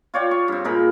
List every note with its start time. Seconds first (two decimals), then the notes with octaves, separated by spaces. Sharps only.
0.14 F4 C#5 D5 G5
0.31 C#6
0.48 G2 C4
0.64 A#2 G#3 A#4 B5